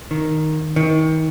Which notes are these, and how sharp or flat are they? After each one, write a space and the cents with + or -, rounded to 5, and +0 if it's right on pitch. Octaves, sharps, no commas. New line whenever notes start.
D#3 +0
D#3 +30